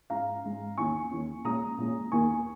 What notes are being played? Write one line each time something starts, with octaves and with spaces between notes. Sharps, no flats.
G#2 G#3 C#4 F5 A#5
G#2 G#3 C#4
D#2 D#3 C#4 G#5 C#6
D#2 D#3 C#4
A#2 G#3 C#4 A#5 D#6
A#2 G#3 C#4
D#2 D#3 A#3 G#5 C#6